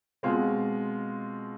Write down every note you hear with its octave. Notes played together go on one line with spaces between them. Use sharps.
B2 G#3 C4 F4